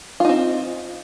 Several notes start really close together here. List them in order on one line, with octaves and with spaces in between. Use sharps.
F4 D#4 C4